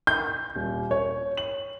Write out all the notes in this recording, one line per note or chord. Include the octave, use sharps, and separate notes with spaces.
G6
D#1
C#5
F#7